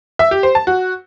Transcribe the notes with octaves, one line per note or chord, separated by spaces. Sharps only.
E5
G4
C5
A5
F#4